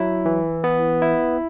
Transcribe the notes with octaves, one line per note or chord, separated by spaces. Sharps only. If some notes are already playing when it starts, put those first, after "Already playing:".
Already playing: F#3 E4
E3
B3
E4